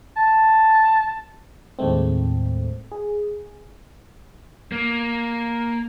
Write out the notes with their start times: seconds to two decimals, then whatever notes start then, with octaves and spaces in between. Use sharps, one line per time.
0.16 A5
1.79 D#2 A2 G#3 A3 C4
2.92 G#4
4.72 A#3